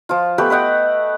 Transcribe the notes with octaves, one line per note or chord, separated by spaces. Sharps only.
F3 F4
A3 B3 G4 B4
B4 D#5 F#5 G5